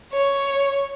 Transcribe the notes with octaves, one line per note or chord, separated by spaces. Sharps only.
C#5